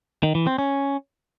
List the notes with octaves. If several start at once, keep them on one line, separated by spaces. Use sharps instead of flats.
D#3
E3
C4
C#4